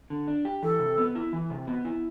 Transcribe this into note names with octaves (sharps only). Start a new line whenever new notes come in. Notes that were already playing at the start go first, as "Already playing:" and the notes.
D3
D4
G4
E3 A4
C3
B3
E4
E3
C3
B3
E4